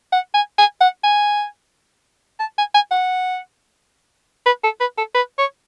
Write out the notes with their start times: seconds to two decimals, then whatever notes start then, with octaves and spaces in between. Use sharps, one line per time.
0.12 F#5
0.34 G#5
0.58 G#5
0.81 F#5
1.04 G#5
2.40 A5
2.58 G#5
2.75 G#5
2.91 F#5
4.46 B4
4.64 A4
4.80 B4
4.98 A4
5.15 B4
5.38 C#5